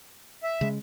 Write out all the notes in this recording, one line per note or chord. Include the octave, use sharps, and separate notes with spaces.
E5
C#3 G#3